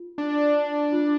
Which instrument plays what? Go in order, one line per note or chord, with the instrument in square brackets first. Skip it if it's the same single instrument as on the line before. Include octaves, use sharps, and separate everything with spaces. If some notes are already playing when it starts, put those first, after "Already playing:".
Already playing: [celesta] F4
[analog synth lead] D4
[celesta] F4